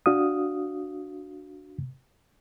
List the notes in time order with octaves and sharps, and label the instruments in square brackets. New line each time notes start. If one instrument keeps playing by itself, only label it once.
[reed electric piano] D4 F#4 F5 D#6